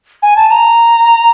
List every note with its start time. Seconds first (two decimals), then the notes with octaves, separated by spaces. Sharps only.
0.22 G#5
0.36 A5
0.50 A#5